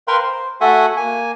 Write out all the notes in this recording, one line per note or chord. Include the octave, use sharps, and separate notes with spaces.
A#4 B4 F5 G5 C6
C5
A3 F#4 A4 E5 F#5 G#5
A#3 G#5